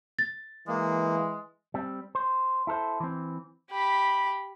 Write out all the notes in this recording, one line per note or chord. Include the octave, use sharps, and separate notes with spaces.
A6
E3 G#3 A#3
G3 C4
C5
E4 A4 A#4 C5
E3 C4
G4 B5